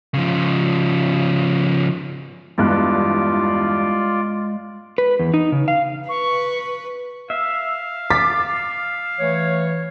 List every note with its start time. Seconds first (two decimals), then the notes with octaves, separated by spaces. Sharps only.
0.14 C#3 F3
2.58 E2 G2 G#3 F4 D5 F#6
4.98 B4
5.19 E2
5.34 D#4
5.52 C#3
5.68 F5
6.09 B4 C#6
7.30 E5 F5
8.10 D6 A6 B6
9.19 E3 A3 C#5